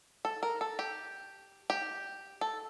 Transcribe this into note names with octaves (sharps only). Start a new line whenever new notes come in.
A4
A#4
A4
G4
G4
A4